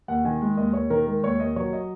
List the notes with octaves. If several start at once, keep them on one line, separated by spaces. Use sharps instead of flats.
D#2 F#5
D#3 G#5
G#3
D#2 D#5
D#2 C#5
D#3 A#4
G#3 A#4
D#2 C#5
D#2 D#5
F#3 C#5
D#5